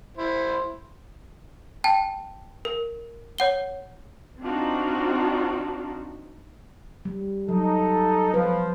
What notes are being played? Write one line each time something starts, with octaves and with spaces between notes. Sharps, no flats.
E4 C5
G5 A5
A#4
C#5 F#5 G7
C4 D4 D#4 F4 F#4
G3
F#3 D#4 A4
F3 B4